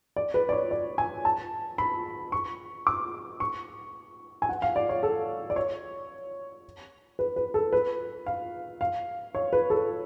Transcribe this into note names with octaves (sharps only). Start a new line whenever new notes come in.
D5
B4
D5
C#5
D5
G#5
A5
B5
C#6
D6
C#6
G#5
F#5
F5
D5
C#5
A4
D5
C#5
B4
B4
A4
B4
F5
F5
C#5
B4
A4